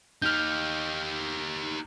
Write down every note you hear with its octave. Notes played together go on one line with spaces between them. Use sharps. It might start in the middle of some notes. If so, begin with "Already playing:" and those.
D#4 G4 F6 G6